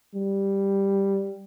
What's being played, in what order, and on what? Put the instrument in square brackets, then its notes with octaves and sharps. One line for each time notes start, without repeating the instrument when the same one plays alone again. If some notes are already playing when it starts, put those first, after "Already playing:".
[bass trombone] G3